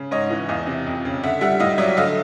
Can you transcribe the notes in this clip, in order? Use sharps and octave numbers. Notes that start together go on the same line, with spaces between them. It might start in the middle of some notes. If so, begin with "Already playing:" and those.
Already playing: C#3
G#2 C#5 D#5
E3
E2 D#5 F5
C3
F2
C#3
D3 E5 F#5
G3 E5 F#5
A2 D#5 F5
F#3 D5 E5
D3 D#5 F5